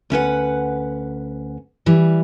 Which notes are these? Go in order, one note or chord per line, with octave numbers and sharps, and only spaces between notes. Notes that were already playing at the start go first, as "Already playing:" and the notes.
D2 C#4 B4 F#5
E3 G3